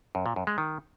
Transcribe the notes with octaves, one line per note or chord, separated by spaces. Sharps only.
F#2
A#2
F#2
G#3
D#3